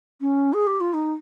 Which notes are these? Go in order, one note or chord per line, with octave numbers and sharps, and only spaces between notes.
C#4
G#4
G4
F4
D#4